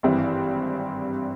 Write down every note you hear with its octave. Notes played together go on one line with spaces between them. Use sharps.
G#1 G2 E3 G3 C4